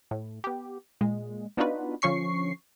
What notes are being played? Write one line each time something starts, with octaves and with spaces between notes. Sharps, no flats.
A2
B3 G4
A#2 G#3
B3 D4 D#4 F4 F#4 B4
D3 F3 C#4 C#6 C7